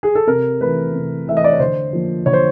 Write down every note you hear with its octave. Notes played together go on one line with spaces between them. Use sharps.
G#4
A4
C3 A#4
E3 A3 B4
C3
E3 A3 E5
D#5
D5
C#5
D3 C5
F3 A#3
D3 C#5
C5